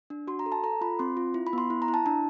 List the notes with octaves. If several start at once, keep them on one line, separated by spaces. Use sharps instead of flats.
D4
F#4 C6
A#5
A4
A5
A4 A#5
F4 B5
C4 C6
F4
E4
B5
B3 C6
E4
A#5
E4
A5
D4 A5